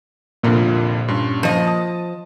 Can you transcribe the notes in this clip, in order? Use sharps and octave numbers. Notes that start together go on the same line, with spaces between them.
C2 F2 A#2 D3
G2 C#4 C6
F3 D#5
A5 D#6